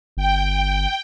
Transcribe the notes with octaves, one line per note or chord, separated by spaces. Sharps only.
G1 G5